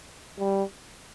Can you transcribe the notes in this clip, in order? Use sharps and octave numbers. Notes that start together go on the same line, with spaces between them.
G3